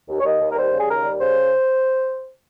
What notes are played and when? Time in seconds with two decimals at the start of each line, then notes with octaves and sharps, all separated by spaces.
0.09 D#2
0.18 C#5
0.24 D#2 D#5
0.40 D#2
0.49 A#4
0.56 G3 C5
0.71 C#3
0.78 G#4
0.87 D#2 A#4
1.02 G3
1.19 C#3 C5